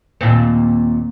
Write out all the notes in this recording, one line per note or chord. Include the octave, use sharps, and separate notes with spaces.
D#2 A#2 C4